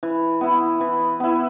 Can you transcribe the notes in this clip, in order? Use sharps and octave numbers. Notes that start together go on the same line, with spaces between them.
E3
B3 E4
E3
B3 E4